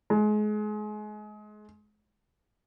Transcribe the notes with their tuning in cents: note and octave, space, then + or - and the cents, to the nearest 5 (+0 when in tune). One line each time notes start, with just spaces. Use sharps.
G#3 +30